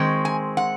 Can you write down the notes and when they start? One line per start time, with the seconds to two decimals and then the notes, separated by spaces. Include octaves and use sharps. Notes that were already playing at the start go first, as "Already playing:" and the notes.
Already playing: D#3 G#3 C4
0.25 G#5
0.57 F#5